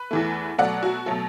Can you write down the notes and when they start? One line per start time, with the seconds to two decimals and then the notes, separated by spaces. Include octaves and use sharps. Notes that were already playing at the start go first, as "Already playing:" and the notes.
Already playing: B4
0.11 E2 E3 A3
0.58 B2 F#3 A3 D5 F#5
0.83 F#4
1.06 B2 F#3 A3 A4